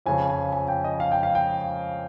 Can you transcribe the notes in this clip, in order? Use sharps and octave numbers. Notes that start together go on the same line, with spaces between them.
F2 C#3 F3 G#5
G#5
G#5
G5
D#5
F5
G5
F5
G5